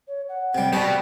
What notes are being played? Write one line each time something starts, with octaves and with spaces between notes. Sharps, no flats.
C#5
F#5
C3 G3 G5
B2 G4 D5 G5